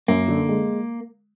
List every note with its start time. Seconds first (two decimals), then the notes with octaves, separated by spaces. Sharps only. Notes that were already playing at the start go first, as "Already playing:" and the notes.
0.08 F#2 A#3
0.28 D3
0.49 G#3